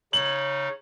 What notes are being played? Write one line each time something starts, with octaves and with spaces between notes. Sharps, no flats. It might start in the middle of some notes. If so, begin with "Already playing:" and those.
C#3 D#4 C#5 F#7